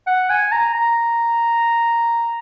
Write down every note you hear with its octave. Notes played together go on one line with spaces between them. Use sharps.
F#5
G#5
A#5
A#5